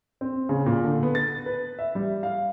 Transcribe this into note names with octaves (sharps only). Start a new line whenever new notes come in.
C4
C#3
A#2
D3
B3
A6
B4
E5
G3
F5